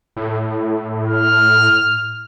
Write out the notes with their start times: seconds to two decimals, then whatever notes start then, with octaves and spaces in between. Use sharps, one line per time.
0.17 A2
1.09 F6